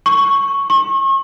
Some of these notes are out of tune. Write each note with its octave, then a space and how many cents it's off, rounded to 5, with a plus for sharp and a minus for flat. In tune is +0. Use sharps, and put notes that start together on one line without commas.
C#6 -5
C#6 -40